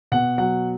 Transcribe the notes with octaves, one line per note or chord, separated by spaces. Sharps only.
B2 F#5
F#3 F#5